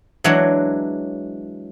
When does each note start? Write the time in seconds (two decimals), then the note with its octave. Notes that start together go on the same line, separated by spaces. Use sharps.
0.24 E3 F#3 G#3 D4 F#4 C#5